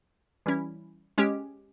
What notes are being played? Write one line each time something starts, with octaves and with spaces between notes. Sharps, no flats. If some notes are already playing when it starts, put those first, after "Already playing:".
E3 G3 C#4 E4
G#3 C#4 G4